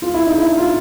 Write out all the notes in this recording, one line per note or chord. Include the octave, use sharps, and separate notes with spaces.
F4
E4
D#4
D4 E4
D#4 F4